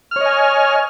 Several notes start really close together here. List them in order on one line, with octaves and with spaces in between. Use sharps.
F6 C#5 D#5 G#5